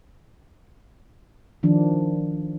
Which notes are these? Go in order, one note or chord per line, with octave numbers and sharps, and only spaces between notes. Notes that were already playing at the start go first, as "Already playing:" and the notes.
D#3 F3 D4